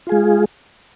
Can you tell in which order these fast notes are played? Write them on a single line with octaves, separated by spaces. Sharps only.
F4 G#4 G#3